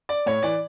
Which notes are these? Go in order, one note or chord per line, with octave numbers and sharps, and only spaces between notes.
D5
A2 C#5
E3 D5